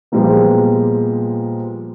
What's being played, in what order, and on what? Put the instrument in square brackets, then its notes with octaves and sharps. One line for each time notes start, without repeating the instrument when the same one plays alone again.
[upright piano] A#2 F3 G3 G#3 A#3 B3